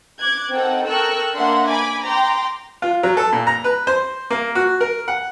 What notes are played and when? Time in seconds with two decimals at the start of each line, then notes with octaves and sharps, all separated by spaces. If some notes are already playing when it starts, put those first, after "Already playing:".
0.20 D6 F#6 G#6
0.52 C4 D#4 A4 A#4 F#5 G5
0.86 A4 A#4 G5 C#6 E6 F#6
1.36 A#3 D4 A#4 E5 F#5 C6
1.68 G#5 B5 D6 G#6
2.04 G5 A#5 C6 D6
2.82 F4
3.03 F#3
3.17 A4
3.33 A#2
3.47 A#5
3.64 B4
3.87 C5
4.31 A#3
4.55 F#4
4.81 A#4
5.08 F#5